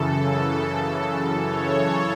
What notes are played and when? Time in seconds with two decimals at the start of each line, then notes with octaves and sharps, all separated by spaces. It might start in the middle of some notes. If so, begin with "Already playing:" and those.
Already playing: F#2 C#3 E3 A4
1.43 C#5